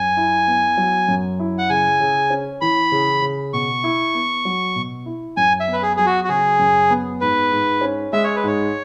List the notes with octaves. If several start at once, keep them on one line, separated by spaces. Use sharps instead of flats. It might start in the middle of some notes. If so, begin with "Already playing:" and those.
Already playing: F#2 G#5
E4
B3
F#3
F#2
E4
F#5
C#3 G#5
C#3
C#4
E3 B5
C#3
C#3
B2 C#6
E4
B3
F#3
B2
E4
F#2 G#5
E5
B3
B4
G#4
F#3 G#4
F#4
F#4
C#3 G#4
F#2
B3
G#2 B4
G#2
C#4
G#3 E5
C#5
B4
G#2 C#5